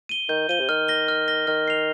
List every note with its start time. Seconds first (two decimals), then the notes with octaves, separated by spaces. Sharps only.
0.09 D#7 G7
0.29 D#3 G6
0.49 F3 D#7 G7
0.60 C3
0.69 D#3 F6
0.88 A#6 G7
1.08 F6
1.28 A#6 G7
1.47 D#3 F6
1.68 C7 F7